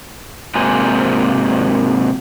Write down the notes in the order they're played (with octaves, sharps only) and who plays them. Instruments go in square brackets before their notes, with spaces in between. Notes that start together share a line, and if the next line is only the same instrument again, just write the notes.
[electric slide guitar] G#2 C3 A#3 F#4 C5 G#5